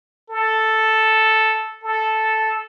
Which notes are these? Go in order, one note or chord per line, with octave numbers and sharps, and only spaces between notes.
A4
A4